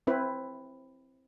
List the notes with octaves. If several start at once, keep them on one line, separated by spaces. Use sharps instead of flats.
C4 E4 B4